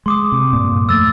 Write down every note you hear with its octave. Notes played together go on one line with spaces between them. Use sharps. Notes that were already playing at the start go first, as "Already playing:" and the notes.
G#3 C6 D6 D#6
C3
G2 A#2
F2 A3 E6 A6